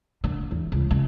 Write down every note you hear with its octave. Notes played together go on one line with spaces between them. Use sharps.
D3
E2
C#2
C#3